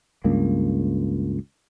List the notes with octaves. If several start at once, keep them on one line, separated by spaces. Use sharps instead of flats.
C#2 G2 A#3